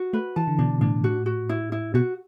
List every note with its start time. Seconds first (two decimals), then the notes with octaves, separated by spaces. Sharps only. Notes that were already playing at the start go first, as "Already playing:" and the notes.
Already playing: F#4
0.13 A3 B4
0.36 E3 A5
0.47 D3
0.59 B2 D4
0.81 A2 D4
1.04 F#4
1.26 F#4
1.49 E4
1.72 E4
1.94 B2 F#4